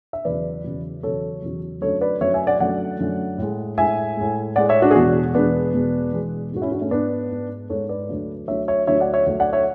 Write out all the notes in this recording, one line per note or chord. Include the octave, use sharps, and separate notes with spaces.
E5
E2 C#3 F#3 B4 D5
E2 C#3 F#3
E2 C#3 F#3 A4 C#5
E2 C#3 F#3
F#2 D3 F#3 A3 A4 C#5
B4 D5
F#2 D3 F#3 A3 C#5 E5
E5 G#5
D5 F#5
F#2 D3 F#3 A3 D5 F#5
F#2 D3 F#3 A3
A2 G#3
A2 G#3 E5 G#5
A2 G#3
A2 G#3 D5 F#5
C#5 E5
D4 F#4
G#4
E2 B2 G#3 D4 F#4
E2 B2 G#3 B3 D4
E2 B2 G#3
E2 B2 G#3
G#2 G#3 F#4
C#4 E4
D4 F#4
A3 C#4
G#2 G#3 B3 D4
G#2 G#3
G#2 G#3 A4 C#5
B4 D5
D2 D3 F#3 A3
D2 D3 F#3 A3 C#5 E5
C#5 E5
D2 D3 F#3 A3 C#5 E5
D5 F#5
C#5 E5
D2 D3 F#3 A3
D5 F#5
C#5 E5